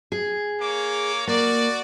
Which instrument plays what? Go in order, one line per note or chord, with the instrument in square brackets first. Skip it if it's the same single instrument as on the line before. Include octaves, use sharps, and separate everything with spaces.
[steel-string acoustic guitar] G#4
[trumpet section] A#3 C#5 D6
[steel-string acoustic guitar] A#3 [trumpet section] F#4 D5